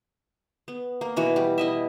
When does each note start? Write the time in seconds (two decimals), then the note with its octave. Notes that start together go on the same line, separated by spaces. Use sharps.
0.68 B3
1.01 A#3
1.16 B2 E3 F#4
1.36 G3
1.58 E4 D#5 E5